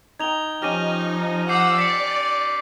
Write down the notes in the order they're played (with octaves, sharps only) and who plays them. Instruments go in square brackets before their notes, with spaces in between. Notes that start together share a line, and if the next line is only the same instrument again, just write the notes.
[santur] D#4 G5 [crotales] G#6 F7 G7
[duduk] F3 [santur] C#4 G4 [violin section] D#4 [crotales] F6 A#6 D#7
[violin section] F#5 E6 [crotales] D6 G6 C7
[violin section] D5 [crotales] B6 C#7